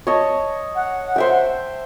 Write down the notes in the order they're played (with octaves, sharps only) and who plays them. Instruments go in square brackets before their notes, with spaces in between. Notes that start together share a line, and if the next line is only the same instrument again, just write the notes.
[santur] C#5 D#5 A5
[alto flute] F#5
[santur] C5 E5 G5